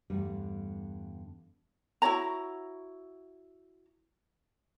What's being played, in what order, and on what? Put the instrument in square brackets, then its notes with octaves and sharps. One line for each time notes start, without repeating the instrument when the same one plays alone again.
[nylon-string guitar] E2 G2 D3 G3 A3
[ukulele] E4 F#4 C#5 A#5